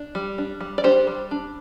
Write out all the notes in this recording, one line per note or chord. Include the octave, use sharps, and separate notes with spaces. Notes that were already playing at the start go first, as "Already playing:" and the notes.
Already playing: D4
G3
D4
G3
D5
D4 G4 C5
G3
D4